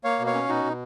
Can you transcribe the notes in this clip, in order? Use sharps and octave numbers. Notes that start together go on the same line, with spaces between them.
A#3 C#5 F5
B2
C#5 F5
C#4
B2 D#4 F#4
B2